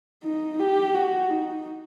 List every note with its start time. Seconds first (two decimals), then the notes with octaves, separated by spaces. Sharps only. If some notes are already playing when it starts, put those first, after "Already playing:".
0.23 D#4
0.60 G4
0.94 F#4
1.30 D#4